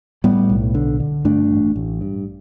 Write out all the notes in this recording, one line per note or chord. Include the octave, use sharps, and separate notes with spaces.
A2 G3 B3
B1
D3
D3
G2 A3 D4
A1
A1
G2